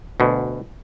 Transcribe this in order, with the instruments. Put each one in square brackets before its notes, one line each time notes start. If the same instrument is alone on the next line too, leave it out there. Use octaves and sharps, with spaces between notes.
[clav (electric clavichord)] D2 B2